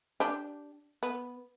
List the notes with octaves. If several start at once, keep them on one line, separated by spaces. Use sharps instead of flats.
D4 G4
B3